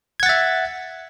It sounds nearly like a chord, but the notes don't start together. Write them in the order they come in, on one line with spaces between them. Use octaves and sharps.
G#6 F#5 A6 E5